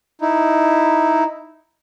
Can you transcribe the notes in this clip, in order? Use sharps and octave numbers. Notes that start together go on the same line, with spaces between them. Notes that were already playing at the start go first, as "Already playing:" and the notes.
D#4 E4